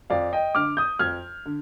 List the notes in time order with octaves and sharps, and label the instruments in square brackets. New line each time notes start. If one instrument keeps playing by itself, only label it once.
[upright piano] F2 D5 F5
D#5 G5
D3 D6 F6
D#6 G6
F2 F6 G#6
D3